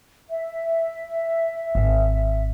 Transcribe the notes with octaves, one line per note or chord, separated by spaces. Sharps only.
E5
G#1